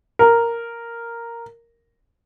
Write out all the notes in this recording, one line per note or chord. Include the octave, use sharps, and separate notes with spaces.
A#4